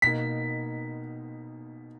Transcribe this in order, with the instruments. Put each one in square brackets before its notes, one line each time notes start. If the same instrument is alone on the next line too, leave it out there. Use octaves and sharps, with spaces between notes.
[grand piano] B2 A#3 D#4 [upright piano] B6